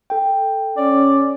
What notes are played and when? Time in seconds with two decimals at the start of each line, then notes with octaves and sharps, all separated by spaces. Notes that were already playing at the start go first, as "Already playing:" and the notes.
0.10 A4 G5
0.77 C#4 D5